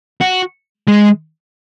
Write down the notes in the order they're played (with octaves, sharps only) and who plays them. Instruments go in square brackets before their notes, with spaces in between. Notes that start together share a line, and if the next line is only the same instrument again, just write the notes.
[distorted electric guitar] F#4
G#3